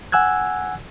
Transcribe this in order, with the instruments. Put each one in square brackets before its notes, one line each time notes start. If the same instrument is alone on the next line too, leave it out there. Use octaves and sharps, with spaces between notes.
[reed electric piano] F#5 G#5 E6 F#6 G#6